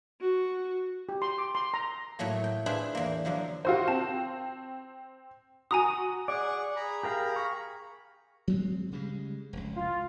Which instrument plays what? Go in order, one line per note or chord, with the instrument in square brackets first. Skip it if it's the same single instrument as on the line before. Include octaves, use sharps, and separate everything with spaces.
[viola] F#4
[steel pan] G4
C6
D6
C6
A#5
[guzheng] A2 F#3 A3 A#3
G5
D4 E4 F4 G#4 B4 C5
E2 A#3
D3 F3 F#3 A#3
[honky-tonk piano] F4 F#4 C5
[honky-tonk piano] C4 [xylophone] A5
[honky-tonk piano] F#4 [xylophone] G#5 A#5 D#6
[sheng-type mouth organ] G#4 F#5 C#6 [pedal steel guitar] D5
[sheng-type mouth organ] G#4 A#5 B5
[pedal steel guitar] G4 A#4 F5
F5 C#6
[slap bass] F#3 G#3 C4
C#3 G3 G#3
F1 C#2
[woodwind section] F4